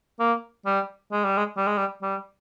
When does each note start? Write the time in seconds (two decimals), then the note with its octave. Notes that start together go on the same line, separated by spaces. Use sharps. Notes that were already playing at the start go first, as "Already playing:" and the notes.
0.19 A#3
0.66 G3
1.12 G#3
1.25 G3
1.38 G#3
1.57 G3
1.67 G#3
1.78 G3
2.02 G3